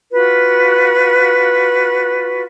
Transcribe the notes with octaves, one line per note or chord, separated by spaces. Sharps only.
F4 F#4 B4